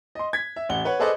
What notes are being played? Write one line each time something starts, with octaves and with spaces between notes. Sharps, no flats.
D#5 C6
G#6 B6
E5
A1 F#5 G7
B4 C#5 F#5
G#4 A4 B4 C5 D5 D#5